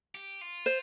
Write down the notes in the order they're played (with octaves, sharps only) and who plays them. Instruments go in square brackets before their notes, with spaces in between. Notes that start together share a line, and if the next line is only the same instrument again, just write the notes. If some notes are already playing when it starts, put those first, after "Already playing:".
[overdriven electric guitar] G4
F4
[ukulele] C5